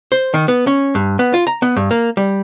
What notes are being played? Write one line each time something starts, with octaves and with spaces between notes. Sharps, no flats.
C5
D#3
B3
C#4
G2
B3
F4
A#5
B3
G2
A#3
G3